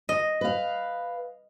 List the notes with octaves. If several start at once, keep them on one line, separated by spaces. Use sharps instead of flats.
D#5
B4 F5